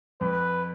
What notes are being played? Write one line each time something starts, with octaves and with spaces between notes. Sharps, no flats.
F2 B4